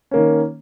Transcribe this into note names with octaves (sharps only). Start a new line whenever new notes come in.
D#3 A#3 C#4